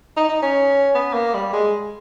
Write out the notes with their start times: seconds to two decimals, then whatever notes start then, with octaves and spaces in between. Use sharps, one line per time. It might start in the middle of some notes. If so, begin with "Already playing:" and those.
0.17 D#4
0.29 D#4
0.43 C#4
0.95 B3
1.14 A#3
1.34 G3
1.53 G#3